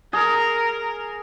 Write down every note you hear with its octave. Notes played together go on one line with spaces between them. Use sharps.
G#4 A#4